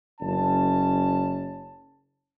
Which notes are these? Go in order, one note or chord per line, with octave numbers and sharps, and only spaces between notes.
F#1 C#4 A5